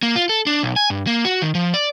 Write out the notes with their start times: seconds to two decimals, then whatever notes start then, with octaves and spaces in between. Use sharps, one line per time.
0.03 A#3
0.16 F4
0.29 A4
0.47 D4
0.63 B1
0.76 G#5
0.90 G2
1.07 A#3
1.25 F#4
1.42 D#3
1.55 F3
1.74 D5